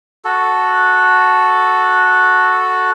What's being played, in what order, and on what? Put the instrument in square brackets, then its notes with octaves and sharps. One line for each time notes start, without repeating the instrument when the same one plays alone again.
[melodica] F#4 A4